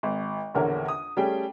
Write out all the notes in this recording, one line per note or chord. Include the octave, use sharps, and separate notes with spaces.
G#1
A#1 E2 D3 A#4 C#5
D#6
G3 A3 C#4 G#4 G5